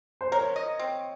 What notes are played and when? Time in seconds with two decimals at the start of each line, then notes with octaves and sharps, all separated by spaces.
0.21 C5
0.32 A#4 C#5
0.56 D#5
0.79 C4